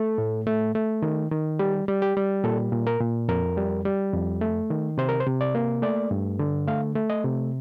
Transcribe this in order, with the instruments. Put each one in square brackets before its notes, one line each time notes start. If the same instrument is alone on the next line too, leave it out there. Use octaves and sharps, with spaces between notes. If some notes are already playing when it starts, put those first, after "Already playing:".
Already playing: [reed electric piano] A3 A4
A2
A3
A3
D#3
D#3
G3 G4
G3
G4
G3
A#2 A4
A#2
A#4
A#2
F2 A#4
G3
G3
F2
A3
D#3
C3 C5
A#4
C5
C3
D5
A#3
A3 D5
G2
D3
A3 F5
A3
D#5
C3